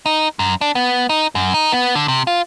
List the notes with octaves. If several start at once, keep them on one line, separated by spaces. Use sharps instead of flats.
D#4
F#2
D4
B3
D#4
F#2
D#4
B3
D3
C3
F4